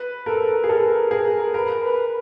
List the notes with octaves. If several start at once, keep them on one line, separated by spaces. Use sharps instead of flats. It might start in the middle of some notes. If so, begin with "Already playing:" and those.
Already playing: B4
A4 A#4
G#4
A4 A#4
G#4 A#4
A#4 B4
B4